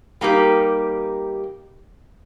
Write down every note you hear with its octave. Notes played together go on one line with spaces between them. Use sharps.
G3 A#3 D#4 G4